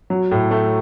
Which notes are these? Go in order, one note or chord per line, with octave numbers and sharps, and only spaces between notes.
F#3
A2
A3